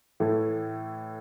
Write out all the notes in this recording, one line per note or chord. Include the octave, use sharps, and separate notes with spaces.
A2 E3 A3